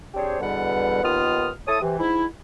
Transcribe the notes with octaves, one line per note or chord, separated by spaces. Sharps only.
C4 D4 G4 G#4 C5 C#5
E2 B2 D3 G3 B4 F#5
D#2 D#3 B3 F4 D#6 F6
E4 A4 C#5 A5 D#6
C3 E3
G#2 E4